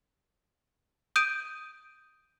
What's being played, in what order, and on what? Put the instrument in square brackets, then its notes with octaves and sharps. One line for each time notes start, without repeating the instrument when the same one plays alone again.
[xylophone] D#6 G6 D7 D#7